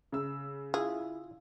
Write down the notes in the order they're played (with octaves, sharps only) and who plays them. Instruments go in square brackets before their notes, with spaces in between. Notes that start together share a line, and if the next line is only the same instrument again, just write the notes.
[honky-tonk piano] C#3 E6
[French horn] E4 [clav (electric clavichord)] F4 E5 [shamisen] G#4